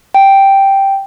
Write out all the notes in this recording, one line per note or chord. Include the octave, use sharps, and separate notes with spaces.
G5